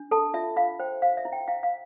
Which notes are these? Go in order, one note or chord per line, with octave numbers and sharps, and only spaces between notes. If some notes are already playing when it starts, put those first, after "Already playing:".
Already playing: D4
A4 A5
F4 E5
F4 F5
C5 G5
C5 F5
E5
E4
G5
E4 F5
F5